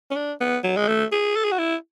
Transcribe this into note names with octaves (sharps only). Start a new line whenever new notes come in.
C#4
D4
B3
F#3
G#3
A3
G#4
A4
G#4
F#4
E4